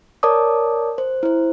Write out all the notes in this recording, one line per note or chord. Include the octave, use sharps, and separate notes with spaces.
A#4 C#5 D5 A5 D6 D#6
C5
E4 C5